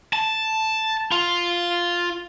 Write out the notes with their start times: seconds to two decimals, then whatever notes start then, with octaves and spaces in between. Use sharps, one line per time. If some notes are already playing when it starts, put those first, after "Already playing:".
0.13 A5
1.12 F4